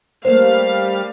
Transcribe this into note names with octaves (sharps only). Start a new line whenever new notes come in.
G3 A3 A#3 D4 C5 F5